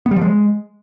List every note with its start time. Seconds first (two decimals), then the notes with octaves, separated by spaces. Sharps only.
0.06 B3
0.11 G3
0.16 F3
0.21 G#3